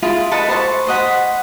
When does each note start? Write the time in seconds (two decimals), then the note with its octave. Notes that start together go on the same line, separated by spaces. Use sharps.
0.02 E4 F4 G#4 A5
0.32 A4 B4 D#5 F#5
0.49 C5 A5 C#6
0.87 C5 D#5 F#5 B5